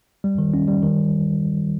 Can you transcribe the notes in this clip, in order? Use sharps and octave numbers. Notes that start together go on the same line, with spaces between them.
G3
D#3
C#4
G3
D#3